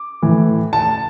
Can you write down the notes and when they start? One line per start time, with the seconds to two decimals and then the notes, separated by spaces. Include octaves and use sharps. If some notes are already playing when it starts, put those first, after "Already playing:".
Already playing: D6
0.22 A2 E3
0.73 A5